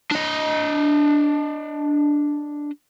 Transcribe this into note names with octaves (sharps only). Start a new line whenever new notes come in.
D4 D#5